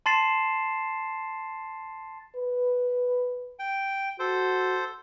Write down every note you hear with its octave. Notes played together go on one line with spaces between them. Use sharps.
A5 C6 A6 C7 E7
B4
G5
F#4 A4 C5